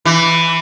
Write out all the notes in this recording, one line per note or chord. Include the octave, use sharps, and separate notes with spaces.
E3